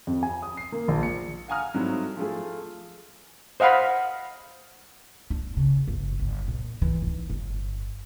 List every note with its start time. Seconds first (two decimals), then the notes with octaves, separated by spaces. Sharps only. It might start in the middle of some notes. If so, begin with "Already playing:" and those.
0.07 F2
0.23 G#5
0.42 D#6
0.57 C7
0.72 A#3
0.88 A#1
1.03 C#7
1.48 F5 F#5 G#5 A#5 D#6 F6
1.74 G#2 F#3 G3 A3 C4 E4
2.17 F3 A3 G#4
3.60 C5 D#5 F5 F#5 B5
5.30 D4
5.57 C#3
5.88 G1
6.19 G1
6.48 A#2
6.82 E3
7.07 D#4
7.30 G1